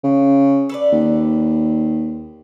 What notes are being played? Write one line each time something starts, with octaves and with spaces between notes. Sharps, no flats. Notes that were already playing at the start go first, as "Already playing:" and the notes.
C#3
A4 B4 D5
D#2